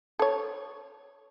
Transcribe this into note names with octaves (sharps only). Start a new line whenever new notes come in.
A4 C#5